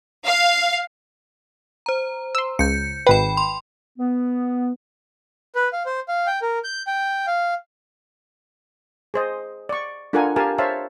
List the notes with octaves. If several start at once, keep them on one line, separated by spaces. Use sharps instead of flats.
F5
C5 A#5
C6 E6
C#2 G6 C#7
G#1 B4 G5 B5
C6
B3
B4
F5
C5
F5
G5
A#4
G6
G5
F5
G#4 C5 D#5
D5 C#6
D4 F4 A4 A#4 F#5 G#5
G4 A#4 F5 G#5 A5
C5 C#5 E5 F5 A5